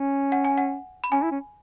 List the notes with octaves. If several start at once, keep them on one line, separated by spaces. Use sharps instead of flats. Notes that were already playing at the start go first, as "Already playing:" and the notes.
Already playing: C#4
F#5
G#5
F#5
B5
C#4 G#5
E4
C#4